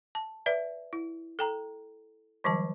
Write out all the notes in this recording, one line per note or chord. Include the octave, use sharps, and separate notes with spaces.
A5
B4 D5 E5
E4
A4 G5 A#5
D3 E3 F#3 G3 A5